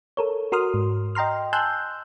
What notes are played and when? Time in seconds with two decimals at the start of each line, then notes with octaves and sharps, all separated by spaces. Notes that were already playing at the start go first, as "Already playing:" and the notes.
0.17 A4 A#4 C#5
0.52 F#4 A#4 C6 D#6 F6
0.74 G#2
1.15 D#5 G5 A#5 C6 F6
1.53 G#5 A5 C6 E6 F#6 G6